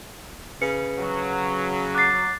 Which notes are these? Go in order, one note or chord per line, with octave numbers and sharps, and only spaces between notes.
C#3 B4 C#7
F#3
D6 F#6 A6 C7